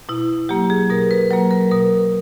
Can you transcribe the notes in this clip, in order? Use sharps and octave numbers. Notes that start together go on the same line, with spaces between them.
B2 E4
F#3 A#3 G4
G#4
B2 A#4
B4
F#3 A#3 B4
A#4
B2 A#4